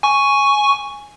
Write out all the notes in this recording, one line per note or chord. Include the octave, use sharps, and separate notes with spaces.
G#5 C#6